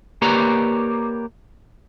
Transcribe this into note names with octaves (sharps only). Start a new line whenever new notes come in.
A#3 G4 B4 C#5 D5 A#5